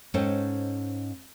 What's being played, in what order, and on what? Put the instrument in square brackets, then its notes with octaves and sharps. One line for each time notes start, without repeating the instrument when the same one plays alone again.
[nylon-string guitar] G#2 C#4 A4 C5 D#5 G5